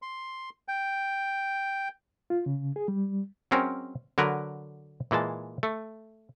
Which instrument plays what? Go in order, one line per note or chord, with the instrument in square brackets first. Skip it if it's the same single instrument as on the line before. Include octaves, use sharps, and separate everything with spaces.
[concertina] C6
G5
[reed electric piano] F4
C#3
G#4
G3
[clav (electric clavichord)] F#3 G#3 C4 C#4 A#4
D3 F#3 A#4 B4
A#2 E3 G#3 A5
A3